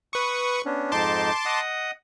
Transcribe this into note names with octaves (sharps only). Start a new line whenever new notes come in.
B4 C#6 D#6
B3 C#4 D4
F2 G#2 D#4 A5 C6 D6
D#5 F#5 D#6